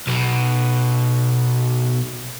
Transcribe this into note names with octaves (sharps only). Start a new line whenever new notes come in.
B1 B2